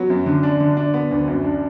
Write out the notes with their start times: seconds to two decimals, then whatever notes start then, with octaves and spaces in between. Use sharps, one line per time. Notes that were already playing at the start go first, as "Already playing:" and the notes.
Already playing: F#3 B3
0.10 F#2
0.26 D3
0.43 D4
0.60 D3
0.77 D4
0.94 B3
1.11 D2
1.28 F#2
1.44 D4